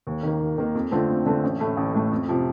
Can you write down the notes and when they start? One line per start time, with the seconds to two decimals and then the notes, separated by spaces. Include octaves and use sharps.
0.07 D#2
0.23 D#3 A#3
0.40 D#2
0.58 D#3 A#3
0.75 F2
0.91 D3 A3 C4 F4
1.09 F2
1.26 D3 A3 C4 F4
1.44 A1
1.60 A2 A3
1.77 A1
1.94 A2 A3
2.12 F2
2.28 C3 F3